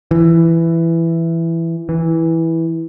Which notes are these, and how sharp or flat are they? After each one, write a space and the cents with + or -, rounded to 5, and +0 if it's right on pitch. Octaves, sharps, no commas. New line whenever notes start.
E3 +10
E3 -10